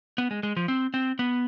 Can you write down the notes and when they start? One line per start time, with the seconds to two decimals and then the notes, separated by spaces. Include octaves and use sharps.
0.18 B3
0.31 G#3
0.43 G#3
0.57 F3
0.68 C4
0.94 C4
1.19 B3